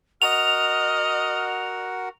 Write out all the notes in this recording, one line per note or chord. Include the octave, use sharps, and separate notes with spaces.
F#4 A#4 D#5 F#5 F6 F7